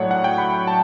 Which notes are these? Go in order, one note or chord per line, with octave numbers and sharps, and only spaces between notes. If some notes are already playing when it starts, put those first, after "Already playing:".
Already playing: A2 F#3 A3 D4 C#5 F#5
F#5
G5
B5
A5